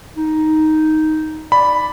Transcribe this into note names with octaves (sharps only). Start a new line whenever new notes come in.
D#4
D5 B5